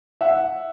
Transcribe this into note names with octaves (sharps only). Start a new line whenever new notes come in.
E5 F#5